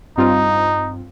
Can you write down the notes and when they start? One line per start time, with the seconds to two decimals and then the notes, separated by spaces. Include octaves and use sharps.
0.18 G2 C4 D#4 F4